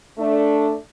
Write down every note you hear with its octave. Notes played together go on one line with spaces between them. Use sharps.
A3 D4